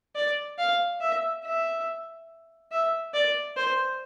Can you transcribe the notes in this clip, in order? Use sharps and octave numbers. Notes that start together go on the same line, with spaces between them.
D5
F5
E5
E5
E5
D5
C5